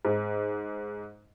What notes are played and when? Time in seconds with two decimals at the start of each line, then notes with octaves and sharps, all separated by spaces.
0.05 G#2